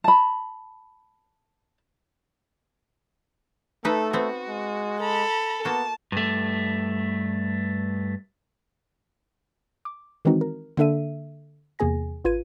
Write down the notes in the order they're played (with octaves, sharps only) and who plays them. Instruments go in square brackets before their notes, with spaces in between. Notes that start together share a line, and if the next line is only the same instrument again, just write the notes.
[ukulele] A5 B5
[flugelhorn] A3 [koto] D#4 B4 [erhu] A4
[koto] B3 C4 [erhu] F#4
[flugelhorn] G#3
[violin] A4 [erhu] B5
[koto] A#3 F#4 [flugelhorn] B3 [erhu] A5
[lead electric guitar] G2 A3
[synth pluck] D6
D#3 E3 G#3 C4 D#4 F#4
A#4
D3 A#3 D4 A4 E5 D#7
E2 C3 A#3 G#4 G#5 A#6
G#1 F4 B4 G#6 D#7